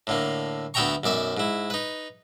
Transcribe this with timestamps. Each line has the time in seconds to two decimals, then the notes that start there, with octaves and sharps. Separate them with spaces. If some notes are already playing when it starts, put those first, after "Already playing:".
0.07 A2 D3 A#3
0.74 D2 B3 E5 G5 A#5 C#6
1.04 B1 F#2 D5 E5
1.37 G#2 E4
1.70 D#4 B4